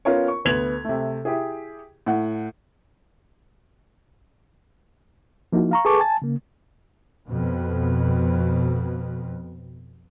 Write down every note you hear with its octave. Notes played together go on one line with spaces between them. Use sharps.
B3 C#4 F4 A#4 C#5
C#6
D2 B3 G#6 F7 F#7
C3 A3
E4 G4 G#4
A2 F#5
F3 A#3 D#4 E4 F#4
F5 A#5 C#6
G#4 A4 B4 A5 C#6 D6
G#5 A5
C#3 A#3
F2 B2